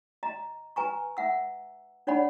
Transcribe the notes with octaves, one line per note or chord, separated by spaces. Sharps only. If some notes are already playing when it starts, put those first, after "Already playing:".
D#5 A#5
B4 G#5 A#5 C#6
E5 F#5 E6
D4 C#5 D5 F#5 B5